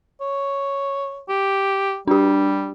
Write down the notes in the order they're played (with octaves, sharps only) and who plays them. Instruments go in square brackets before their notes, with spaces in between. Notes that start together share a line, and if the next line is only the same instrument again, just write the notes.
[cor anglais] C#5
G4
[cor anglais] G3 [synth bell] D4 G4